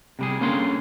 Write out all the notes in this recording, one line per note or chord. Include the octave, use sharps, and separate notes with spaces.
C3 G3 G#4
D3 A#3 C#4 G#4 C6